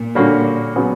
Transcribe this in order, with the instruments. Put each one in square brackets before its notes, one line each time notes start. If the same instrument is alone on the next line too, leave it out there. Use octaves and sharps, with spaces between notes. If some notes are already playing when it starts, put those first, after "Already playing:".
Already playing: [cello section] A#2
[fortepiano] D3 G3 A#3 C#4 F#4
C#3 F#3 B3